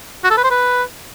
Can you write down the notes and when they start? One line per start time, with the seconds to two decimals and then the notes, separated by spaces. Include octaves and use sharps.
0.24 F#4
0.30 A4
0.37 B4
0.44 C5
0.51 B4